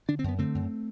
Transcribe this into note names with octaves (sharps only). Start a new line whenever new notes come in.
D3 D4
C4
F#2 B3
D3 A3 C4
F#2